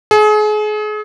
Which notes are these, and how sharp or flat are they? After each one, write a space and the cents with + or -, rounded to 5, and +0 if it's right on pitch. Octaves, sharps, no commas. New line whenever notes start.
G#4 +35